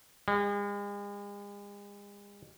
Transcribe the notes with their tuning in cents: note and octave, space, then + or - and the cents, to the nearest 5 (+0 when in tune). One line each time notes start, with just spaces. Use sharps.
G#3 -40